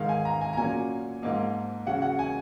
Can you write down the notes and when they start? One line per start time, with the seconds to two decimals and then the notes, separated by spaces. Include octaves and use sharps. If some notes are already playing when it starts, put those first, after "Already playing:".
Already playing: G#2 D#3 G#3 F5
0.09 G#5
0.25 A#5
0.41 G#5
0.53 A#5
0.57 A#2 F#3 A#3 C#4 G#5
1.22 G#2 F3 A#3 D#4
1.86 C#3 F#3 C#4 F#5
2.02 F#5
2.19 G#5